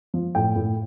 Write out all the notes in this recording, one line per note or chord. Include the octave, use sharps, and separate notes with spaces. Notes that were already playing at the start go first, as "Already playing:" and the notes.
F3
A2 G5
A2